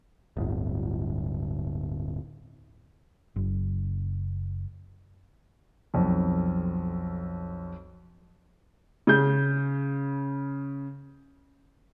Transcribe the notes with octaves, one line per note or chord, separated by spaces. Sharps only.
D1 G1
F#1
B1 F2
C#3 G6